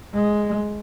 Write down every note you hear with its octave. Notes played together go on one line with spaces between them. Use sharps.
G#3